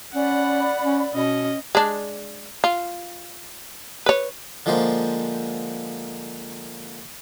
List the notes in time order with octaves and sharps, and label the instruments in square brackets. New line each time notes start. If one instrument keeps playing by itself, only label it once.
[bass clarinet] C#4 [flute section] D5 B5 [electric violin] F#5
[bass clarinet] C#4
[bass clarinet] B2 [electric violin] C#4 D#5
[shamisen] G#3 D4
F4
B4 C#5
[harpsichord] D3 F3 G#3 A#3 C5